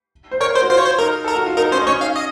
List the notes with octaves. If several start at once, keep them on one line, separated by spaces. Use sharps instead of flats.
C5
A#4 C#5
C5
F#4
F4 C5
C#5
C5
D#4 A#4
A4 A#4
F#4
F4
D#4 A#4
C#4 C5
D#4
C#4 C#5
F5
D#5